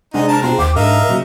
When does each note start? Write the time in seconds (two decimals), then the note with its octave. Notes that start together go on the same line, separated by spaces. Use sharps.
0.14 C3 G#3 D4 D#4 F#5 G#5
0.28 A5 A#5
0.42 B2 C4 D4 F4 G#4 C5
0.59 D#2 F5 D6
0.76 G#2 D4 D#4 A4 A#4 E5 F5
1.09 A#2 C#3 F#3 F#4